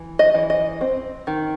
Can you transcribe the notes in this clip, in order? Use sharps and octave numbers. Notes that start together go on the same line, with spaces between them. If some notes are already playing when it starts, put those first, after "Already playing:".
Already playing: E3
D#5
E3
D#5
C4
D#3